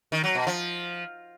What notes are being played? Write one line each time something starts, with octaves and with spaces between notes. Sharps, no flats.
D#3
F#3
B2
F3